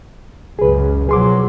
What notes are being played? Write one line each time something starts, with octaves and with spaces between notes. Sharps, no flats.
C#2 F#2 G#4 B4
B2 F3 F#3 G#4 C6 D6